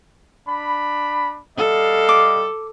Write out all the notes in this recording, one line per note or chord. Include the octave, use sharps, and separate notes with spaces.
D4 B5
G3 A4 D#5 F5
D6